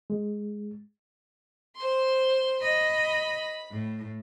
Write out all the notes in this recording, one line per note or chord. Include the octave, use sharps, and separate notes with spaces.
G#3
C5 C6
D#5 B5
A2